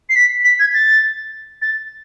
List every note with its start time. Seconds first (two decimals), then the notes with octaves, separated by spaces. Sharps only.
0.09 C7
0.15 B6
0.44 B6
0.59 G#6
0.74 A6
1.62 A6